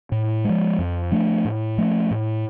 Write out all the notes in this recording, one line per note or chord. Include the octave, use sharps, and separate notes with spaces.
A2
F3 G#3
F2
F3 A3 D4
A2
F3 A3 C#4
A2